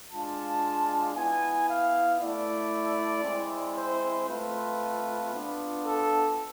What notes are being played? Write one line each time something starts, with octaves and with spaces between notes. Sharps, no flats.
G#3 D4 F4 A5
B3 E4 G#5
F5
A3 E4 D5
G#3 C4 E4
C5
A3 C4 F4 B4
B3 D4 F4
A4